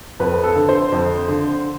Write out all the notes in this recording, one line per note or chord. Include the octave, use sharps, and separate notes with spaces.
F2 B4
A4
D3
C5
F2
D3